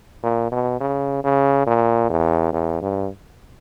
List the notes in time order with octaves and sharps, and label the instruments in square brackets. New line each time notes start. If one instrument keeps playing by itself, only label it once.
[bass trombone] A#2
B2
C#3
C#3
A#2
E2
E2
G2